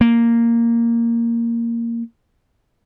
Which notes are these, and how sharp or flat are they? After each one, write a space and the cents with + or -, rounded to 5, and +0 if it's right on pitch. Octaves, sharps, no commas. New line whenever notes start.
A#3 -5